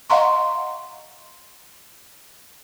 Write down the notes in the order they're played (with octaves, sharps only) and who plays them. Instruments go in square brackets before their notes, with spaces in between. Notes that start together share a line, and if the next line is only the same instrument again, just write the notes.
[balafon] D#5 F5 F#5 A#5 C6 C#6